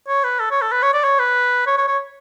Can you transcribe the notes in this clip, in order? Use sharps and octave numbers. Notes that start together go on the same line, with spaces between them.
C#5
B4
A4
C#5
A4
B4
C#5
D5
C#5
B4
C#5
C#5
C#5